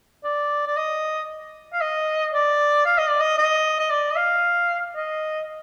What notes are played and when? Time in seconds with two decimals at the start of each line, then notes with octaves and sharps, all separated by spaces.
0.24 D5
0.67 D5
0.77 D#5
1.73 F5
1.81 D#5
2.33 D5
2.86 F5
2.98 D#5
3.09 D5
3.21 D#5
3.38 D#5
3.79 D#5
3.90 D5
4.11 D#5
4.16 F5
4.96 D#5